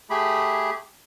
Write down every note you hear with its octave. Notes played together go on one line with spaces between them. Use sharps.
A3 G4 G#4 B5